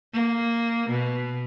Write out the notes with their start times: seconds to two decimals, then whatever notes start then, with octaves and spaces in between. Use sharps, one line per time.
0.13 A#3
0.90 B2